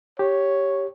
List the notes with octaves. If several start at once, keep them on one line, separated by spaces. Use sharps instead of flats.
G4 C#5